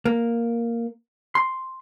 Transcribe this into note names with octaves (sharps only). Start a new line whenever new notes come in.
A#3
C6